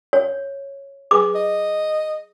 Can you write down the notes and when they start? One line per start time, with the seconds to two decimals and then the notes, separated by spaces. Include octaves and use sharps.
0.13 C#5
1.11 G#4 B4 G#5 D6
1.35 D#5